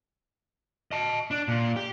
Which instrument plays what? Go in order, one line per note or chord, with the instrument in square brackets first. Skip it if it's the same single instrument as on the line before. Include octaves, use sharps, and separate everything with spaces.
[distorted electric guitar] D#5 A5
D4
A#2
G4